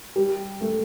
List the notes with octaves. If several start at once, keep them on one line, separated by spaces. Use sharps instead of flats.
G3
A3